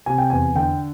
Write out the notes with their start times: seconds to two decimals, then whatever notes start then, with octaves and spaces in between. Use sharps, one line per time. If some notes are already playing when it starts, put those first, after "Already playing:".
0.06 C3 G#5
0.18 G5
0.30 E2 G#5
0.55 D3 G5